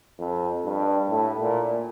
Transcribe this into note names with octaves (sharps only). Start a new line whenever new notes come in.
F2
G2
A2
A#2